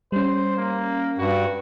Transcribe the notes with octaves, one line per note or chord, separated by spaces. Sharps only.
G3 C#4 C5
A#3
G2 F#4